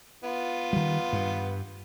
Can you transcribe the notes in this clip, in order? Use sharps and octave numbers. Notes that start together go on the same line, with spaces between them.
B3 F4
D#3 G3
G2